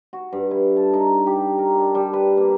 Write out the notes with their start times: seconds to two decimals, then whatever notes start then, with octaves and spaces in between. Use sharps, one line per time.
0.13 F#4
0.33 G2
0.51 E4
0.77 A4
0.93 D#4
1.27 G4
1.58 A#4
1.78 D4
1.95 G3
2.13 B4
2.37 A#3